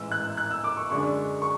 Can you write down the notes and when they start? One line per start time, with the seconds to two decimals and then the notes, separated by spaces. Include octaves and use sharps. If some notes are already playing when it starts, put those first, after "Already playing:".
Already playing: A1 G#2 E3 E6
0.12 F#6
0.37 F#6
0.51 E6
0.64 D6
0.77 C#6
0.90 F#2 D3 G#3 D4 C#6
1.42 C#6